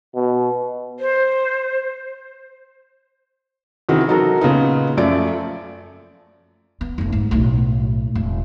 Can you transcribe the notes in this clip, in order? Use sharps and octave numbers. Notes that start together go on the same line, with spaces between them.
B2
C5
C3 D#3 E3 F#4 G#4
F#3 D#4 F#4 A4 A#4
A#2 C#3 B3 D#4
F#2 F3 A3 D5 D7
B3
F1 B3
G#2
B1 A2
E1